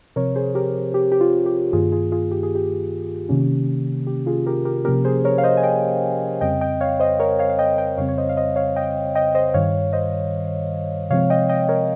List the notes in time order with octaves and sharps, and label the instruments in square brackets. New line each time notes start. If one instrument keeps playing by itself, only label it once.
[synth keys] C3 F3 C4 A#4 C#5
G#4 C5
G4 A#4
G4
G4
F4
G4
G2 D#3 A#3 F4 G#4
F4 G#4
F4 G#4
G4
G#4
G4
C3 D#3 A#3 C#4
G4
F4 G#4
G4 A#4
G4 A#4
C3 F3 A#3 C#4 G4 A#4
G#4 C5
A#4 C#5
F5
C5 D#5
G#5
D#5 G5
F2 C#3 G3 C4 D#5 G5
D#5 G5
C#5 F5
C5 D#5
A#4 C#5
C#5 F5
F5
D#5 G5
D#5 G5
F2 C#3 G3 C4 C#5 F5
C#5
C5 D#5
F5
C5 D#5
C#5 F5
D#5 G5
D#5 G5
C5 D#5
G2 D#3 G3 C#5 F5
C5 D#5
C3 F3 G#3 C4 C#5 F5
D#5 G5
D#5 G5
A#4 C#5